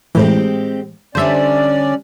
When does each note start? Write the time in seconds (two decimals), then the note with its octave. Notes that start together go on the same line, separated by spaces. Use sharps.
0.15 A2 E3 G#3 C4 G4
1.15 D3 G3 C#4 D4 C5 D5 E5